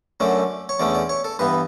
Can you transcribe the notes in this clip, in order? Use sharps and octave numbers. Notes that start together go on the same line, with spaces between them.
F#2 D3 F#3 A3 C#4 D5
C#5
E2 D3 A3 C#4 D5
D5
C#5
A4
G2 E3 B3 B4